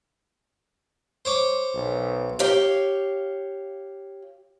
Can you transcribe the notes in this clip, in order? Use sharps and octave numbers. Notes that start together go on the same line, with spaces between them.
C5 C#5 D6
B1
G4 C#5 F5